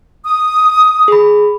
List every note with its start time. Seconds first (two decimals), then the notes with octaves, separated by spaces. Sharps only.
0.25 D#6
1.08 G#4 B5